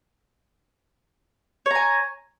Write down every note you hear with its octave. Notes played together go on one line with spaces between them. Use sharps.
C#5 G#5 A#5